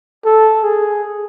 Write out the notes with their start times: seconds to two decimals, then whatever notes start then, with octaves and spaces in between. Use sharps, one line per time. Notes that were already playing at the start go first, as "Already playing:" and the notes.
0.25 A4
0.63 G#4